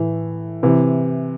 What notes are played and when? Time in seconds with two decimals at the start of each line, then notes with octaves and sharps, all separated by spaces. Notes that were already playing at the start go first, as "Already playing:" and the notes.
Already playing: A2 E3
0.63 C3 E3